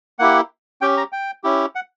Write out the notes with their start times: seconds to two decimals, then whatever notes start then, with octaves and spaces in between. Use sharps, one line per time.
0.19 A#3 E4 G4 F#5
0.81 C#4 G4 G5
0.97 A#5
1.12 G5
1.44 C#4 E4 G4
1.75 F#5